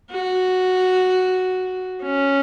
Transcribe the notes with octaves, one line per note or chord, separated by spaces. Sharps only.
F#4
C#4